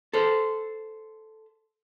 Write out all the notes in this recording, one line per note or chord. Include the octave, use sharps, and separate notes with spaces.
A4 C5